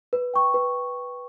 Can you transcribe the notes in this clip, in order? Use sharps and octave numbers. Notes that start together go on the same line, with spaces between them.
B4
G5 C#6
B4